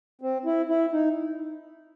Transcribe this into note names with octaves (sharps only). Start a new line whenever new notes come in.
C4
E4
E4
D#4